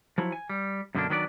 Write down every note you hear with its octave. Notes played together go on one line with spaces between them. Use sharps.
F3 F#3 E4
G#5
G3
F#2 B2 D3 G#3 A#3 D4
D#3 F#3 B3 D4 B4 D5